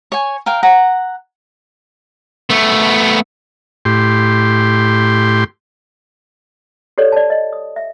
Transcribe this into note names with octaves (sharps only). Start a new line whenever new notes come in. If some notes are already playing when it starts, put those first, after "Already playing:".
C#5 G#5
A#4 F5 G5
F#5 A#5
A3 B3
A2 G4 C6
G4 A4 C#5 D5
D5 A5
D#5
D#6
E5